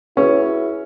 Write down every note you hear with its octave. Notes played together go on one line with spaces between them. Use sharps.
C#4 E4 F#4 G#4 B4